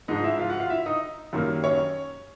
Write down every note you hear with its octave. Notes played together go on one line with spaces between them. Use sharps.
G#2 F3 G#3 D#4 D#5
E4 E5
F4 F5
F#4 F#5
F4 F5
E4 E5
D#4 D#5
F#2 D#3 G3 A#3
C#4 C#5